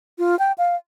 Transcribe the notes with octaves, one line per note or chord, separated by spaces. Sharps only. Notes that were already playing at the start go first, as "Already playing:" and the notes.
F4
G5
F5